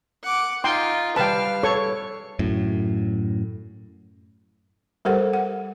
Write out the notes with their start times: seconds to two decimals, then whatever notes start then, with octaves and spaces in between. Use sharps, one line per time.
0.23 F#5 D6
0.64 D#4 F4 G5 C6
1.16 G3 B4 F5 G5 A5
1.63 A4 C#5 C#6
2.39 F#2 A2
5.05 G3 G4 A4 A#4 C5 F#5
5.33 F#5